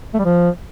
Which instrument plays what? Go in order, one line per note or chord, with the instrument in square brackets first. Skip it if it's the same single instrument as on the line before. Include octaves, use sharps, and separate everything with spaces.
[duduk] A3
G3
F3